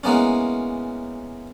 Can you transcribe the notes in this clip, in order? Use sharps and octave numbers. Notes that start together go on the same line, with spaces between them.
E3 G#3 A#3 B3 C#4